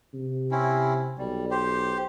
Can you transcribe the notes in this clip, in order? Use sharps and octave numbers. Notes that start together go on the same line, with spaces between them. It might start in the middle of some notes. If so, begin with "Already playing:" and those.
C3
C4 C#4 E4
B1 G3
G4 C5